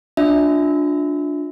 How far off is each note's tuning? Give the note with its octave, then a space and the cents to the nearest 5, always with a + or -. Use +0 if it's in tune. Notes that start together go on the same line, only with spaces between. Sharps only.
D4 +0 F4 +25 E5 -20